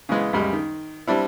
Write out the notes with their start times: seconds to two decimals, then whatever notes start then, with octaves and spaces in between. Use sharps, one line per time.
0.09 C#3 E3 G#3 B3
0.33 C#2 F#2 G3 G#3
0.53 D#3
1.07 G3 C4 D4 E4